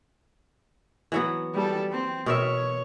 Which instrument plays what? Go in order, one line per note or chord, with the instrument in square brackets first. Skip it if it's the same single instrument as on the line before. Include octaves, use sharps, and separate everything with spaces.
[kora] E3 F#3 B3
[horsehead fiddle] G3 A4
C4
[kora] B2 A#4 E5 [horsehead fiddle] C#5